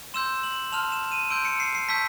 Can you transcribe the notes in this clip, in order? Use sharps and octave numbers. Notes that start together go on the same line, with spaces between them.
C6 E6 G6 E7
F#7
A5 C6 F6 F7
E7
D#7
C6 E6 G6 D7
C#7
C7
C7
A5 C#6 E6 G6 B6